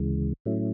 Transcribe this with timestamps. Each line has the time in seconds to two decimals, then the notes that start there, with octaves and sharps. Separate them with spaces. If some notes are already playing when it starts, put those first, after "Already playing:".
Already playing: D2 C#3 E3 G#3
0.46 A2 F#3 A3 C#4 E4